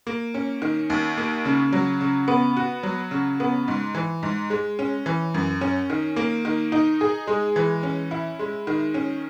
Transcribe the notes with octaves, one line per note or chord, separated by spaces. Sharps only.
A#3
C#4
D#3
D#2
A#3
C#3
F#3
C#3
B3
F#4
F#3
C#3
B3
G#2
E3
G#2
G#3
C#4
E3
F#2
C#4
D#3
A#3
D#3
D#4
G#4
G#3
E3
C#4
E4
G#3
D#3
C#4